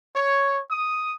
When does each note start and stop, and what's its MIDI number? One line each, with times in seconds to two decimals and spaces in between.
0.15 0.61 73
0.70 1.12 87